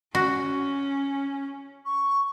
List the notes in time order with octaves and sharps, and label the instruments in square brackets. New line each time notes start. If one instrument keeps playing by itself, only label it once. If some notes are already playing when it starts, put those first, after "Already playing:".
[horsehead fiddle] C#4 [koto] F#4
[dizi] C#6